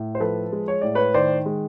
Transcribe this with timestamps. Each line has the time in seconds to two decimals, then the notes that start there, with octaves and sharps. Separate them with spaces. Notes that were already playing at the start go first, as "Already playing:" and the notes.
Already playing: A2
0.15 C5
0.20 F3 A4 B4
0.52 G#3
0.68 C#5
0.81 A2 D5
0.95 B4 C#5
1.14 D#3 C5 D5
1.46 G#3